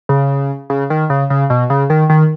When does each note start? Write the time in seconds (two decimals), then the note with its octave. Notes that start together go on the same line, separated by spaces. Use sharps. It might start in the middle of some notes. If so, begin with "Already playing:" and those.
0.09 C#3
0.70 C#3
0.90 D#3
1.10 C#3
1.30 C#3
1.50 B2
1.70 C#3
1.90 D#3
2.10 D#3